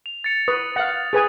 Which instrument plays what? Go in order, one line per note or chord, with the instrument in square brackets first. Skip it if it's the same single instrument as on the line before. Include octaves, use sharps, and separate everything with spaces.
[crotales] F7
A6 C#7 F7
[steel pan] B4 [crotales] D#6
[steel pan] F5 F#5
G#4 B4 G#5